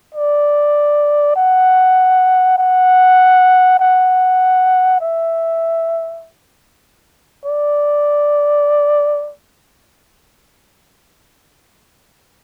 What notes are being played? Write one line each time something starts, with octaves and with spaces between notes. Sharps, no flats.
D5
F#5
F#5
F#5
E5
D5